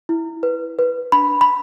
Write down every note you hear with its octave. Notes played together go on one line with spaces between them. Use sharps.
E4
B4
B4
D4 B5
B5